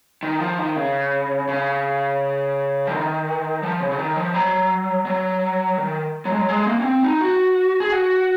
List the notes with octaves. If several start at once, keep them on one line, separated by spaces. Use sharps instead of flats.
D#3
F3
D#3
C#3
C#3
F3
D#3
F3
C#3
C#3
D#3
F3
F#3
F#3
D#3
F#3
G#3
F#3
G#3
A#3
C#4
C4
D#4
F#4
G#4
F#4